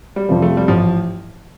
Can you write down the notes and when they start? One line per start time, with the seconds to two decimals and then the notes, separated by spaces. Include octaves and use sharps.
0.16 G3
0.29 F2 C3 F3
0.42 A3
0.57 G3
0.68 A1 F3